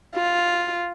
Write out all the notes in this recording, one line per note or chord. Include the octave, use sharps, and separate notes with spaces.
F4